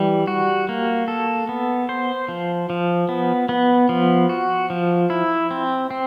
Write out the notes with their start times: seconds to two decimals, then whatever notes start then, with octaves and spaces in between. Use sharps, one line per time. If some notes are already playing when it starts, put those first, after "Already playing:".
Already playing: E3 G3
0.27 F#4
0.69 A#3
1.08 A4
1.49 B3
1.89 C5
2.28 F3
2.70 F3
3.09 B3
3.49 B3
3.89 F3
4.29 F#4
4.70 F3
5.10 E4
5.51 C4
5.91 C4